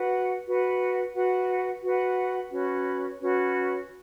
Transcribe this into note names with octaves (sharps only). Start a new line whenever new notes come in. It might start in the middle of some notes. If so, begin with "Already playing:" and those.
Already playing: F#4 B4 F#5
F#4 B4 F#5
F#4 B4 F#5
F#4 B4 F#5
C#4 F#4 B4
C#4 F#4 B4